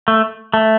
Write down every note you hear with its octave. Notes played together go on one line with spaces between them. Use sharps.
A3
A3